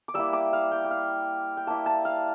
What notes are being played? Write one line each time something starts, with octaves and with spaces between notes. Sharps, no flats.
D6
G3 A#3 E4 E6
D6
F5
G5
G5
F5
G5
A#3 E4 A5
A5
F5